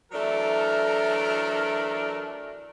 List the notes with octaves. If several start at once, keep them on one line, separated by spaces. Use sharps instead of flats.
E3 F#3 A3 D4 A4 A#4